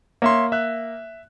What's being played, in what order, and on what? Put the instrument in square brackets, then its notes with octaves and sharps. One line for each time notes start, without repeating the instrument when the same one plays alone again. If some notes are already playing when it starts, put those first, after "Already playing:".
[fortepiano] A#3 [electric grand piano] C#5 E5 C6
[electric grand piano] E5 F#6